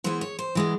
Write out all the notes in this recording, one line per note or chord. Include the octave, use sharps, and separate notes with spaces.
E3 G#3 B3 C5
C#5
C5
E3 G#3 B3